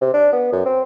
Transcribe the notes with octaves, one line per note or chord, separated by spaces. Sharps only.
C3
D4
B3
F#2
C4